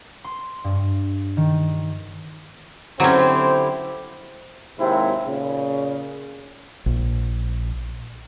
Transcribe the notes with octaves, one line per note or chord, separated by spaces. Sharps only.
C6
G2
D#3
D3 F#3 C4 C#4 E4 G4 C5
D#2 G#2 C3 C4 E4
A#2 C#3
A#1